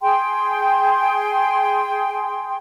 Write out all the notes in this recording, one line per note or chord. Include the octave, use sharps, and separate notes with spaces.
G#4 G5 C6